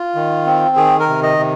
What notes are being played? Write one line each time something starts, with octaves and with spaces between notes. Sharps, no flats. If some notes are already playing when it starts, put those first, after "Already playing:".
Already playing: F4
D#3
C4
D#3 G#4
A#4
C3
D#5
C3